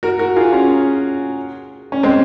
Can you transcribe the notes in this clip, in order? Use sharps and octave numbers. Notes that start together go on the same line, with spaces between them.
F#4 A#4
F#4 A#4
F4 G#4
C#4 F4
C#4
G#3 C4